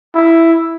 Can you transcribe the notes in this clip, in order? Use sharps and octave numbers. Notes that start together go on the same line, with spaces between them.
E4